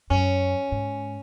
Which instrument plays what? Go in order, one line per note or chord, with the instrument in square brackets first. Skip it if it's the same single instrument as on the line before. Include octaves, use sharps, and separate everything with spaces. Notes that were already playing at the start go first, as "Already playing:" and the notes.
[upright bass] F#2 [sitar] C#4
[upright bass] G#2